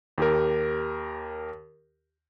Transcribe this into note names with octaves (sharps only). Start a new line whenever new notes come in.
D#2 G4 A#4